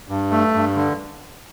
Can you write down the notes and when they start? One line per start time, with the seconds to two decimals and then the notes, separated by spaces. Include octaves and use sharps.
0.09 G2
0.31 A3
0.54 G2
0.76 D3